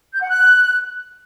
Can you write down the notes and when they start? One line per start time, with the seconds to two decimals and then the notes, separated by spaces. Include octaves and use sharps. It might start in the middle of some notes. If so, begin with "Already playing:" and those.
0.12 G6
0.21 F#5
0.29 F#6